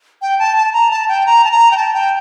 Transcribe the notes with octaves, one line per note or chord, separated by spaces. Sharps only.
G5
A5
A5
A#5
A5
G5
A#5
A5
A#5
G5
A5
G5